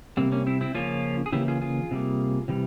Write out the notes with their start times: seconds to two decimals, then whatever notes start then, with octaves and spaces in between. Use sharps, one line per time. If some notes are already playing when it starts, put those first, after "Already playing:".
0.17 C3 G3 A#3 C4
0.32 A#3 C#4
0.47 C4 E4
0.61 C4 E4
0.75 C#3 F3 A#3 C#4 F4
1.26 G#4
1.32 C#3 E3 A#3 E4 G4
1.48 F4 G#4
1.61 F4 G#4
1.91 C3 G3 A#3
2.48 C3 E3 G3